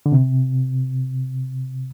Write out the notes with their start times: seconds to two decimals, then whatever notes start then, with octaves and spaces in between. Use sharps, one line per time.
0.06 D3
0.12 C3